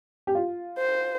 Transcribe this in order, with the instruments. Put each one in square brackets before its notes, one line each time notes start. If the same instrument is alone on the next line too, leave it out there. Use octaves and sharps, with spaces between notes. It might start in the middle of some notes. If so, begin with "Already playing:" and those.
[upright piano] G4
F4
[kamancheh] C5